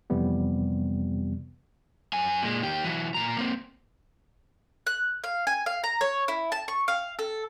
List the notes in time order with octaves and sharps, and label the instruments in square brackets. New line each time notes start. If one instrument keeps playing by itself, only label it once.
[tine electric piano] F2 C3 E3 G3 B3
[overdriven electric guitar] F#2 G#5
A#2 G#3
D#3 G4
E3 F#3
A#2 A#5
A#3 C4
[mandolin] F#6
F5
G#5
F5
A#5
C#5
E4
A5
C#6
F5
A4